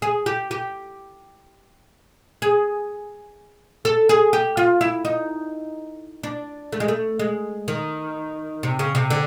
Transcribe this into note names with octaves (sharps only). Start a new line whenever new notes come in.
G#4
G4
G4
G#4
A4
G#4
G4
F4
E4
D#4
D4
A3
G#3
A3
G#3
D#3
C3
C#3
C3
D3